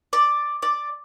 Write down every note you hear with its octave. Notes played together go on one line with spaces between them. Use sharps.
D5
D5